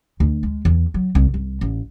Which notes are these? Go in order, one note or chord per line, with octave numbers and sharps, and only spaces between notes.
D2
G#3
E2
F#3
C2
C2
A1